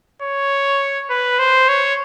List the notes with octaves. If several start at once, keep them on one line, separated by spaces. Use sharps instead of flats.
C#5
B4
C5
C#5